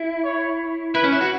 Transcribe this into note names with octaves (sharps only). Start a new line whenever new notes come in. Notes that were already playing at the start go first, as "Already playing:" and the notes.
Already playing: E4
C#5
E4 B4
C#4
E4
F#4